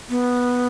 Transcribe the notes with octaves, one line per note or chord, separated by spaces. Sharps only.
B3